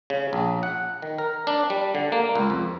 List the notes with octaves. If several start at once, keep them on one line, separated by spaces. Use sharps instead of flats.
C#3
A#1
F#5
D#3
A#4
D4
G3
D3
A#3
C#2
F2